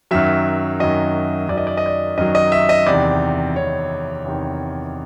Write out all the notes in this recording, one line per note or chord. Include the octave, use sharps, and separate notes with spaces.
F#2 D#3 F#3 E5
F#2 D#3 F#3 D#5
F#2 D#3 F#3 D5
D#5
D5
D#5
D5
F#2 D#3 F#3 D#5
D#5
E5
D#5
E2 C3 D#3 D5
E2 C3 D#3 C#5
E2 C3 D#3